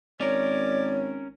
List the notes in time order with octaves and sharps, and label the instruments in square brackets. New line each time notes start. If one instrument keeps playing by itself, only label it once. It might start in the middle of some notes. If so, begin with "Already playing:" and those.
[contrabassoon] G#1 [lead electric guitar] C#4 A#4 [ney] C#5 [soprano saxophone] D5